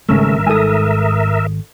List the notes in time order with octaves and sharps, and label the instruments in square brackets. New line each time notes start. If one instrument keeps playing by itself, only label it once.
[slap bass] G#1 G3 [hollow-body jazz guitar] G#2 C#3 A3 [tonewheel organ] A#4 E5
[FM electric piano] G#2 D#6 [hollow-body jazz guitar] A4 G#5